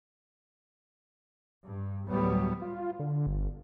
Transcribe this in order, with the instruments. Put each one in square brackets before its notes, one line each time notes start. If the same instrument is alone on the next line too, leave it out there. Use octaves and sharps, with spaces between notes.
[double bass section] G2
D2 A2 F#3 G3 B3
[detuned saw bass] F4
D3
G1